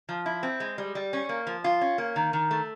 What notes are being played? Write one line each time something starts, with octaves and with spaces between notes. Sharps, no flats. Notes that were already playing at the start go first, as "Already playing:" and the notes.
F3
E4
C4
G#3
G3
G3
C#4
A#3
F3
F4
C#4
A#3
D#3
D#3
A3